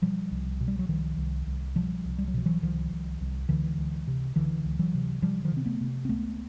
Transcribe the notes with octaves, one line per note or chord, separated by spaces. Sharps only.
B2 F3 G3
C2
B2
G3
F#3
C2 D#3 F3
C2
C2
B2 F3 G3
C2
G3
F#3
B2 F3
E3 F#3
C2 D#3 F3
C2
C2
C#2 D3 E3
C#2
C3
C#2 D3 E3
C#2
E3 F#3
C3
C3 F3 G3
D#3 F3
C3 C4
A3 B3
C3
C4
C#2 A3 B3